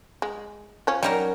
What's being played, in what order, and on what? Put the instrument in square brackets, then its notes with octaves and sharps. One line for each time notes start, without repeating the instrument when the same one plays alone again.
[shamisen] G#3
F3 C#4
[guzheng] F#3 C#4 A#4 [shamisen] G3 D#4